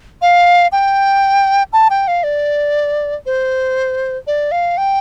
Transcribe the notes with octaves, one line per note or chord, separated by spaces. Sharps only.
F5
G5
A5
G5
F5
D5
C5
D5
F5
G5